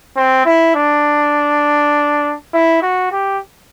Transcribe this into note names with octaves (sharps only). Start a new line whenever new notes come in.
C4
E4
D4
E4
F#4
G4